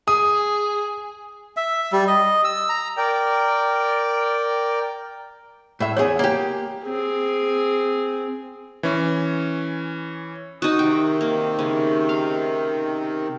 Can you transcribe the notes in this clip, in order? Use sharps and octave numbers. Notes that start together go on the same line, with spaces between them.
G#4 D#6
E5
G3
D#5
E6
A#5
A#4 D5 G5
A2 E5
E2 G#4 C#5
A#3 G4
C4 G#4
E3 C#4
D#4 F#4 D#6
C3 D#3 G5
A#3
C#3
F5